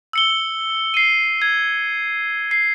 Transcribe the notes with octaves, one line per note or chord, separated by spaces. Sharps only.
E6 C#7 G7
C7 D#7
G#6
C7